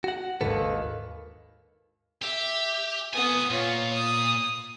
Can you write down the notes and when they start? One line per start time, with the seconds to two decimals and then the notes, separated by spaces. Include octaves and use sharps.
0.04 F#4 F#5
0.41 G#1 D#2 A4 B4
2.22 G4 E5
3.13 B3 F4 G#5 D#6
3.50 A#2 F4 C#5
3.94 D#6